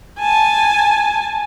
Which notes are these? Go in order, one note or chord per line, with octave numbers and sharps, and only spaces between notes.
G#5 A5